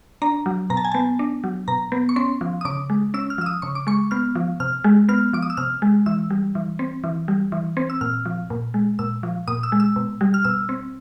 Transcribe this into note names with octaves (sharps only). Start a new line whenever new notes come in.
D4 A#5
F#3
B2 A#5
A5
G#5
B3 A5
D4
F#3
B2 A#5
B3
C#6
C#4 C6
F3
D#6
C#3 D6
G#3
C#4 E6
F6
F3 E6
D#6
C#3 C#6
D6
G#3 C#6
B3 F6
F3
C3 F6
G#3
B3 F6
F3 D6
D#6
E6
C3 F6
G#3
E3 E6
G3
E3
C4
E3
G3
E3
C4
E6
A#2 F6
F3
A#2
G#3
A#2 E6
F3
A#2 D#6
E6
G#3
E6
B2
G3
F6
B2 E6
C4